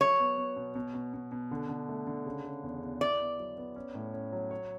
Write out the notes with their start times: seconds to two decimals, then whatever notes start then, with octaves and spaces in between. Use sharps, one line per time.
0.01 F#3 C#5
0.20 B3
0.38 B3
0.56 B2
0.75 B2
0.95 B2
1.14 B2
1.32 B2
1.51 D3
1.69 D3
1.89 A3
2.07 D3
2.26 C#3
2.45 C#3
2.63 E2
2.82 E2
3.01 E4 D5
3.20 B3
3.39 F#3
3.58 B3
3.76 C#4
3.95 A2
4.14 C#4
4.32 F#3
4.51 C#5